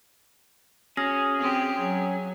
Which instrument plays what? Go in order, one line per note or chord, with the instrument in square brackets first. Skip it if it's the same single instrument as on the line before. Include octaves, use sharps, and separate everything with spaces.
[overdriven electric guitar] C#4 [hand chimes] F#4 F6 A#6 [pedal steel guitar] G#4
[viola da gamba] C4 G4
F#3